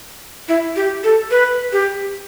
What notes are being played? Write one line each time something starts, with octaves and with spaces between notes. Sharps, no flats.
E4
G4
A4
B4
G4